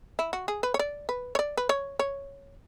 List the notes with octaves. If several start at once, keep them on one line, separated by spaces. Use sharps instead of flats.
E4
F#4
G#4
B4
C#5
D5
B4
C#5
D5
B4
C#5
C#5